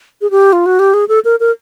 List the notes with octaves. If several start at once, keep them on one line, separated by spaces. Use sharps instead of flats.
G#4
G4
F4
F#4
G4
G#4
A4
A#4
A#4